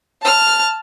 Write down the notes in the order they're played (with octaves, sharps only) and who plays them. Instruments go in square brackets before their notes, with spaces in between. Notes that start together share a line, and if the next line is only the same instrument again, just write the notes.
[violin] A5 F6